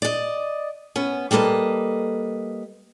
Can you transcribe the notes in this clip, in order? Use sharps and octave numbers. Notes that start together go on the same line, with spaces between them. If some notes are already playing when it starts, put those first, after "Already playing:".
D5 D#5
B3 C#4
G3 A#3 A4 B4 D#5